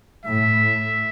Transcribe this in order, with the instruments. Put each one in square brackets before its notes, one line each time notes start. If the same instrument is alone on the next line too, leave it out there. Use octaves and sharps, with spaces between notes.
[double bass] A2 [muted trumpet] E5